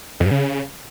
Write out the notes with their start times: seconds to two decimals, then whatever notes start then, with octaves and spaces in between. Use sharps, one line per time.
0.20 F2
0.26 G2
0.31 C#3